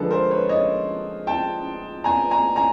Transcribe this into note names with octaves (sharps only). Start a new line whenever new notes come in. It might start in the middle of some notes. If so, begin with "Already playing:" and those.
Already playing: D3 F3 G#3 A4 B4
A#4 C5
B4 C#5
C#5 D#5
G5 A5
G#5 A#5
G#5 A#5
G#5 A#5